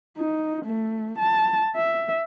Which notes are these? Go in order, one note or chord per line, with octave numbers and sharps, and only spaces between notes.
D#4
A3
A5
E5